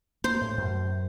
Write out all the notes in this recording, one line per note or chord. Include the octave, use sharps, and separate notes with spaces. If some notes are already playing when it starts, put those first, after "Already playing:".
A#3 C5
A2
F#2